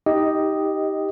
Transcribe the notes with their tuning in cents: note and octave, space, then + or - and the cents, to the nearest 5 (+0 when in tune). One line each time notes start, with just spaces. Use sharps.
D#4 +20 G4 +0 D#5 +0